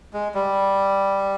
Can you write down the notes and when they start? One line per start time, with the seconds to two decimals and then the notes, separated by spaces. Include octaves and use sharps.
0.13 G#3
0.35 G3